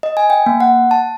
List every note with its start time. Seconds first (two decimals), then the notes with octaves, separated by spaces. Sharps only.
0.03 D#5
0.17 G#5
0.30 G5
0.46 A#3
0.60 F#5
0.91 A5